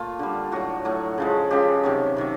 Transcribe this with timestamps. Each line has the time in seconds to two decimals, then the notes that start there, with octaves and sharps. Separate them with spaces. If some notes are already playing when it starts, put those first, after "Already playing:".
Already playing: A#2 A3 F4
0.19 D3 G3
0.52 A2 F#3 A3 F#4
0.85 A2 F#3 A3
1.18 C#3 F3 G#3
1.51 C#3 F3 G#3 G4
1.83 C3 D#3 F#3
2.16 C3 D#3 F#3